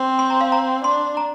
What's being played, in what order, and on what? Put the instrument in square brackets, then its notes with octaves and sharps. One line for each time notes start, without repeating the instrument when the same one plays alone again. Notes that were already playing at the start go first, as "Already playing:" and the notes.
Already playing: [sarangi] C4
[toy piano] C6
A#5
F5
A#5
[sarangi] D4 [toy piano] C6
[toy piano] A#5